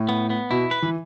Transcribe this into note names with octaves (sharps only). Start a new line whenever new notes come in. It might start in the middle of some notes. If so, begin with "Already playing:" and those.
Already playing: A2
B3
B3
B2 E4
B4
E3